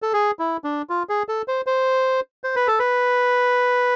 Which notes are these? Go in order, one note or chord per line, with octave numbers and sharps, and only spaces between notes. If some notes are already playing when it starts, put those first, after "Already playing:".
A4
G#4
E4
D4
F4
G#4
A4
C5
C5
C5
B4
A4
B4